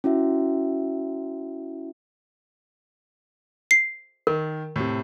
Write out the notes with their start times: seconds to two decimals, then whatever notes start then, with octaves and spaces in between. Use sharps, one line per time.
0.04 C#4 E4 F#4 E5
3.71 C7
4.27 D#3 A#4
4.76 A2 C3